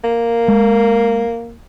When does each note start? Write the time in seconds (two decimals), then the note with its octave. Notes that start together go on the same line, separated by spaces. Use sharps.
0.04 A#3
0.48 G#3